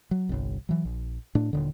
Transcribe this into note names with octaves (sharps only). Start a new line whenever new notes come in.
F#3
G1 C2
E3 F#3
A#1
A2 D4
D#1 D3